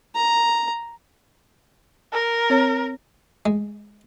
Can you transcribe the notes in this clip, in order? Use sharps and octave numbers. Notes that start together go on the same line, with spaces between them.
A#5
A#4
C4 C#5
G#3